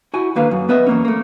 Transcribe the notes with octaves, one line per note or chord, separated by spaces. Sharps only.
E4 F#4 G#5
D#2 D3 A#3 B4 F5
F#2
B3 B4 D#5 E5
E2 A#3 C#4
A3 A#3